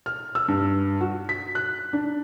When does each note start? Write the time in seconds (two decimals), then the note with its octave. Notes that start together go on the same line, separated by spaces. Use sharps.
0.06 F6
0.35 E6
0.48 G2
1.01 F#4
1.29 B6
1.55 F#6
1.93 D4